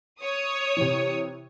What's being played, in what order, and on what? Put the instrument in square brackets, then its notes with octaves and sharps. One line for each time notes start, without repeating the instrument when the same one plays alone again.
[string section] C#5 D#6
[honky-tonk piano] C3 E3